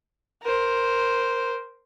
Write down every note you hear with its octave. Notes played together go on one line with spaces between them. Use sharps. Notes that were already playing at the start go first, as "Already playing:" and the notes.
A#4 C5